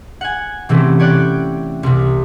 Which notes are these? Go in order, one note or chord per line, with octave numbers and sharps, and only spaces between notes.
F#5 G#5
C3 E3 A3 C4 C#4
C#5 D5 G5 F#6
C2 C3